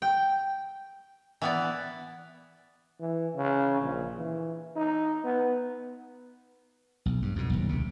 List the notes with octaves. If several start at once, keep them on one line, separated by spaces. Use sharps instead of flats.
G5
E3 B3 D5
E3
C#3
A#1
E3
D#4
B3
B1
G2
F2 B2
D#1 B1
D2 C3